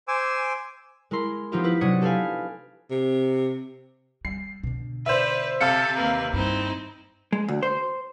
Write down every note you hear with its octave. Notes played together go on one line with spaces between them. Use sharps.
C5 G#5 D6 E6
G#3 E4 A#4 C6
F3 B3 D#4 F4 G4 E5
E4 B4
C3 F#3 D4 D#6 G#6 C#7
G4 A4 B4 F5 G#5
C3
G3 C7
B2 D3
B4 C5 D5 E5
C3 A4 F5 C#7
D#2 A#3 B4
G2 C4 D#4 E4
G#3
D2
C5